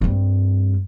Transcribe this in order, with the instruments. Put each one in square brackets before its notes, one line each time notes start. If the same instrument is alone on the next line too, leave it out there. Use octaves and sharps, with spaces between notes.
[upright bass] G2 C4